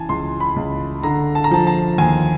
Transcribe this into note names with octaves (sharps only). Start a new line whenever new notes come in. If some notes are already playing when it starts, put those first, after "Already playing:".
Already playing: C#3 E3 G#5 A5
C#2 C6
B5
C#2
D3 A#5
A5
A#5
F3 A5
A5
D#2 G#5